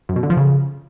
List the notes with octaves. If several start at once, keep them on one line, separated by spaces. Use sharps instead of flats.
F#2
B2
D3
F3
C#3